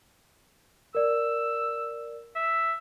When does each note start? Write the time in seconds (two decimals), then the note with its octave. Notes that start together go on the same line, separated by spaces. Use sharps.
0.95 A#4 D5 E6
2.36 E5